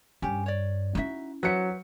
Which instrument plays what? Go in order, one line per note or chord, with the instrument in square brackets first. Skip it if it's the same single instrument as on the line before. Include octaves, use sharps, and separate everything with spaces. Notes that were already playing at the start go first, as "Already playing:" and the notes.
[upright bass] G2 [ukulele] C#4 G4
[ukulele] C#5 D5
[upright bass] C#4 E4 [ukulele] D#4 F#4 E5
[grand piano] F#3 C#7 [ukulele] B4 C5 E5